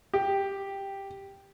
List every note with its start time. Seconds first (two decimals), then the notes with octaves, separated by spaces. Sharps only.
0.14 G4